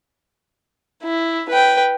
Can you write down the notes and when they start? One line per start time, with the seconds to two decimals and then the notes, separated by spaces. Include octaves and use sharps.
1.03 E4
1.49 B4 G5